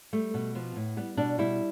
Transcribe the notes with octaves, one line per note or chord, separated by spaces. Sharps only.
G3 A3
B2
F3 B3
A2
G3 B3
B2 D4
G3 E4